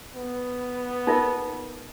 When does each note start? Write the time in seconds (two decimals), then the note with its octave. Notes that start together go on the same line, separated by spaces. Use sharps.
0.15 B3
1.07 D#4 F4 A#4